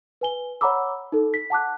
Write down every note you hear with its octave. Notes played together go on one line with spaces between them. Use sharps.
B4 G#5 G7
C#5 F#5 A#5 B5 D6 E6
D#4 A4
B6
F#5 A5 D6 F#6